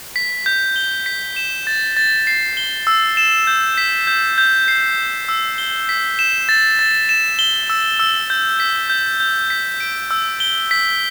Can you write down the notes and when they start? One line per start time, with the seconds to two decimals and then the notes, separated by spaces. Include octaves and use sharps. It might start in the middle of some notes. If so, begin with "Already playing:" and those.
0.16 B6
0.46 G6
0.76 G7
1.06 B6
1.36 E7
1.67 A6
1.97 A6
2.27 C7
2.57 G7
2.87 E6
3.17 E7
3.47 G6
3.78 B6
4.07 G6
4.38 G6
4.68 C7
4.98 E7
5.29 E6
5.58 G7
5.89 B6
6.19 E7
6.49 A6
6.79 A6
7.09 E7
7.39 G7
7.70 E6
7.99 E6
8.30 G6
8.60 B6
8.90 G6
9.20 G6
9.50 B6
9.80 D7
10.11 E6
10.40 G7
10.71 B6